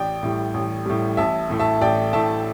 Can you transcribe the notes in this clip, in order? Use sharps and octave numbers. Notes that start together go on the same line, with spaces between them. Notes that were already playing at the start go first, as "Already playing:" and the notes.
Already playing: A1 D5 G5
A2 G3
A1
A2 G3
A1 E5 A5
A2 A3
E5 A5
A1 D5 G5
A2 A3 E5 A5